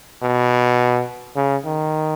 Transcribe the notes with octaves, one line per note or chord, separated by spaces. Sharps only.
B2
C#3
D#3